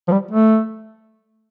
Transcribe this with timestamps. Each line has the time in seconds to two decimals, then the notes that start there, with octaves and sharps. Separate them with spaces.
0.08 F3
0.12 G3
0.31 A3